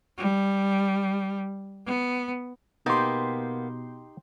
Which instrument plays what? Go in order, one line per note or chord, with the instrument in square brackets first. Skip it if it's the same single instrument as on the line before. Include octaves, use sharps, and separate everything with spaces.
[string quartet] G3
B3
[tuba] B2 [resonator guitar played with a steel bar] A#3 B3 [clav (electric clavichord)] D#4 G4 [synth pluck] G5 C6